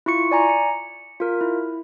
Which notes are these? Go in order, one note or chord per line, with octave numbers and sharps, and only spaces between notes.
E4 F4 C#6 C#7
D5 G#5 A#5
C#7
F4 A#4
E4